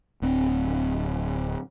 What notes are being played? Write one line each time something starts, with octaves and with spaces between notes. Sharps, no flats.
D1 C4